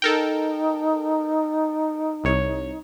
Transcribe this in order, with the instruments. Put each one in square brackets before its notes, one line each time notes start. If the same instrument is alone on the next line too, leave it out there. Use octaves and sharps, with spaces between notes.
[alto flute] D#4 [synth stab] A4 A#4 G5
[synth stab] C2 C#5